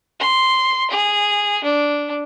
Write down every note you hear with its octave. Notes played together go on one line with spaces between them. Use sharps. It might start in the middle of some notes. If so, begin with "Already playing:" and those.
C6
G#4
D4